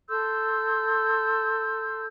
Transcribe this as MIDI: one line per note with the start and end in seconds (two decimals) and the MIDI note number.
0.09 2.06 69
0.09 2.06 84
0.09 2.06 88
0.09 2.06 91